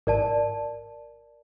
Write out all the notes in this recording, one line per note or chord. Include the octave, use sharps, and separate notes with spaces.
G#1 A#4 D5 A5